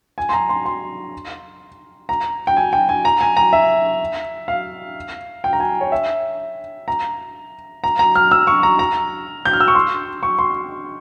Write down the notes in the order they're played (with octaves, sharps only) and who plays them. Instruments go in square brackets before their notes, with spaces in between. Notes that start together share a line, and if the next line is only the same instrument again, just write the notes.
[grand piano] G#5
C6
A#5
C6
C6
A#5
G5
G#5
G5
G#5
A#5
G#5
A#5
E5
F5
G5
A#5
G#5
C#5
E5
A#5
A#5
A#5
F6
E6
C#6
A#5
A#5
G6
F6
E6
C#6
C6
C#6
C6